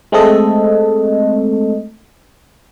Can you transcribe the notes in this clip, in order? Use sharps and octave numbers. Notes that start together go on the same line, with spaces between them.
G#3 A3 C4 A4 D#5